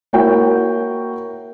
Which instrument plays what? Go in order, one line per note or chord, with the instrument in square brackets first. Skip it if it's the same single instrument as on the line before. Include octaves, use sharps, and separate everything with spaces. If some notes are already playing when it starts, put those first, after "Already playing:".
[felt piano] A#3 E4 F#4 A#4 C#5 G5